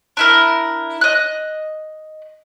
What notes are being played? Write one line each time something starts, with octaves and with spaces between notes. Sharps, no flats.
D4 E4 A#4
D#5 F#6